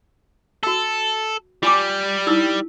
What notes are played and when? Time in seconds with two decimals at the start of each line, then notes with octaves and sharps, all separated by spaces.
0.63 F#4 A4 E6
1.63 G3 F4 G#5 D6
2.27 D#4 E4 E6